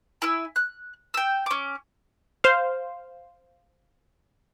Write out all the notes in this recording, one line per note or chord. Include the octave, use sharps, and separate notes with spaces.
E4 G#5 E6
F#6
G5 E6
C#4 D6
C5 F5